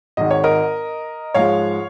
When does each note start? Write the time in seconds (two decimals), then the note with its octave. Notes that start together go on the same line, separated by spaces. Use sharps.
0.17 G#1 G#2 D#3 D#5
0.31 C#5
0.44 A#4 D#5
1.34 G#2 F3 G#3 C#5 F5